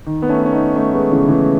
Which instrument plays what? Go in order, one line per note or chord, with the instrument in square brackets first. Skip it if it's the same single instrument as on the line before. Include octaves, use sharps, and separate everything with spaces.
[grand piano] D#3
B3
A3 C#4
B3
C#4
B3 D#4
A3 C#4
G#3 B3
C#3 E3
C#3 E3